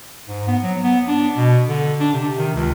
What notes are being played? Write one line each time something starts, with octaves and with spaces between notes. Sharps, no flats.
G#2
B3
F#3
B3
D4
B2
D3
D4
C3
D#3
C#2